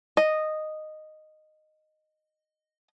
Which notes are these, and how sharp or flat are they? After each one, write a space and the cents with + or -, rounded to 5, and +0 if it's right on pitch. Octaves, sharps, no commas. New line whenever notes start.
D#5 -10